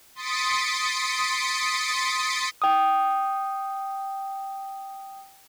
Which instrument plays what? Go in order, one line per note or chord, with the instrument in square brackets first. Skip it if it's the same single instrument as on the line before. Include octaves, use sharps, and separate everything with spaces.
[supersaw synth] C6 D#6 A6 B6 C#7 D7
[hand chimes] G5 D#6